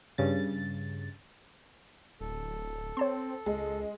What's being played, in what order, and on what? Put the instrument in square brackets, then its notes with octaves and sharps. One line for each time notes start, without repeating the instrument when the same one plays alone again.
[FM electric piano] G2 C#3 A6
[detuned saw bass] D1 [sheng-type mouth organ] A4
[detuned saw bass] C4 [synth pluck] C#5 A5 C6
[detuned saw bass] C#2 [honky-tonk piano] G#3